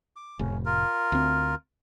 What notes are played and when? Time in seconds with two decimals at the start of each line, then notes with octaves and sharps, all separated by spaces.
0.16 D6
0.39 F1 A2 C3 C#4
0.65 F4 A#4
1.12 D2 C4